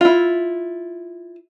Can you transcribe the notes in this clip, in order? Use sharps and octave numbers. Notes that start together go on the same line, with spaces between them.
E4 F4